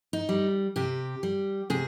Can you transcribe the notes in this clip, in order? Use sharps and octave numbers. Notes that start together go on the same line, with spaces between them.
D#4
G3
C3 G4
G3
C3 G#4